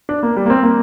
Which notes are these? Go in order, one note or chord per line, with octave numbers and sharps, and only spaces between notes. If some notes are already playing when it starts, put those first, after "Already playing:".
D4
A#3
G3
A#3
C4
A#3